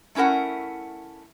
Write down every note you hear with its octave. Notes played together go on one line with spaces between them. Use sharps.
A3 C#4 E4 A#4 F#5